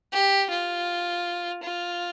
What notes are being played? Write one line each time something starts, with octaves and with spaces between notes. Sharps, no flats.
G4
F4
F4